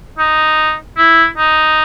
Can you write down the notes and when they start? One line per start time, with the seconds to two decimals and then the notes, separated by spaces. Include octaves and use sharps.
0.18 D#4
0.98 E4
1.38 D#4